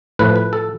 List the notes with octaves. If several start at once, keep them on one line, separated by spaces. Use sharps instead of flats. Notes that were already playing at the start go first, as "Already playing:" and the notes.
A2 F3 A3 B4
B4
A4